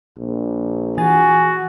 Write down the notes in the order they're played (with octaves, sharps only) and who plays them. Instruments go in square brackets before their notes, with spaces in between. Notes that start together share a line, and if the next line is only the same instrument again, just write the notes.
[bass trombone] A#1
[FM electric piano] E3 A6 [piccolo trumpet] F#4 [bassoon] G#4